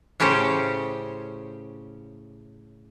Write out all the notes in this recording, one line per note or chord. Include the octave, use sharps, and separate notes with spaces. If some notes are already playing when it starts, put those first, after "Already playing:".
A2 C#3 C#4 G4 C5